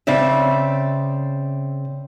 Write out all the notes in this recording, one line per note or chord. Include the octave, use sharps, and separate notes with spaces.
C#3 C4 D5 E5